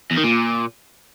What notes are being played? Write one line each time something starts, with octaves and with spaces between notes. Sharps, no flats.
E2
D#3
A#2